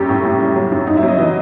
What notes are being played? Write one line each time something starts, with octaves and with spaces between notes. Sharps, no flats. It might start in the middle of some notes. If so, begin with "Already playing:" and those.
Already playing: F#2 G3 G4
A2
A2
G3
F#3
F#2
F#2 D#4
E4
F#3
D#5
E3 D#5